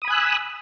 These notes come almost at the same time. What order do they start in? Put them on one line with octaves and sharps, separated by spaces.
D#6 B5 G#5 F#6 E6